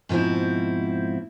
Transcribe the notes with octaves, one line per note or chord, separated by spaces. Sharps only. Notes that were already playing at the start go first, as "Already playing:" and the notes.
G#2 B2 F3 C4 E4